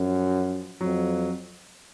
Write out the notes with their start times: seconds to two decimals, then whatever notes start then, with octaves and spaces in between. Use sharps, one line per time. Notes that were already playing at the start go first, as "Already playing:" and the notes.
Already playing: F#2 F3
0.81 F2 F#3